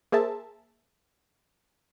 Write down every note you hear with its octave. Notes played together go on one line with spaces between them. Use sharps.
A#3 G#4 A#4 C5 E5 A5